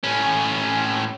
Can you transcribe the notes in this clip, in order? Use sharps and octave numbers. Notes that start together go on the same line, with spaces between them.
A2 C#4